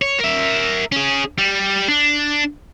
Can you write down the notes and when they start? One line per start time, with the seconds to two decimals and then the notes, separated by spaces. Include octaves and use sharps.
0.02 C#5
0.20 A#4 E5
0.92 C#4 G#4
1.38 G3
1.89 D4